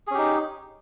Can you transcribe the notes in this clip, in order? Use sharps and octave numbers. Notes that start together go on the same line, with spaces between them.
C#4 D#4 G4 G#4